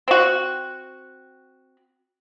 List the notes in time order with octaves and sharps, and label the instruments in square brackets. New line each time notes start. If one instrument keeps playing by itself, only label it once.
[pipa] C4 F#4